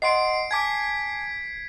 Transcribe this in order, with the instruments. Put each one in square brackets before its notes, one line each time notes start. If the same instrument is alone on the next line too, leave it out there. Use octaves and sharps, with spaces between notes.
[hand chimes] D#5 F#5 C6 [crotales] C7 D7
[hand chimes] G#5 A5 D6 [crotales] G#6 B6